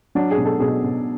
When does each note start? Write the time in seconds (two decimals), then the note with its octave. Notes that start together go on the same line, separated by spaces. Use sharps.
0.15 F#3 D4
0.31 G#4
0.38 B2
0.45 A4
0.60 B2 G#4
0.83 B2